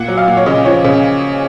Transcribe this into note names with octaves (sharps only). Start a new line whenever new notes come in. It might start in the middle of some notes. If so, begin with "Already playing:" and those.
Already playing: A#2 F#5
F#3
F5
A#2
C#5
C#3 D#5
F3 C#5
C#3